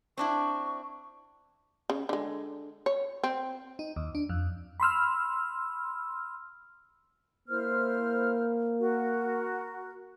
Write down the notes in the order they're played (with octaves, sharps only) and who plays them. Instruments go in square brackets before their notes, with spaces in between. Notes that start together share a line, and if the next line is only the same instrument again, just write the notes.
[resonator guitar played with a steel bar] C4 D4 E4 [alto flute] C#6
[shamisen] C#3
D3 G#3
C#5
C4
[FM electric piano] D#4
D#2
D4
F2
B5 C6 E6 F6
[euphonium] A#3 [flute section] E4 C5 F6
[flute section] F#4 A#4